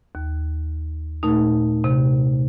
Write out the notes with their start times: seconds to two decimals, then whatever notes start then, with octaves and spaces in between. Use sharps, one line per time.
0.15 D#2
1.23 A#2 A3 D#4
1.84 C3